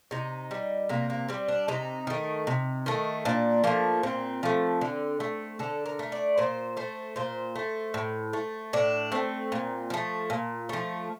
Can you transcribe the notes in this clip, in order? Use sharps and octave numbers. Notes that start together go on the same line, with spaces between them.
C3 D#4
G3
C3 A#3
A#3
G3 C4
D4
C3 D#4
D#3 A3
C3
D#3 A3
A#2 D4
F3 A3 A#3
A#2 C4
F3 A3
D3
A3
D3 A4
A#4
A3
D5
A#2 C5
A3 C5
A#2 C5
A3
A2
A3
A2 D4
A3 C4
A#2
F3 A3
A#2
F3 A3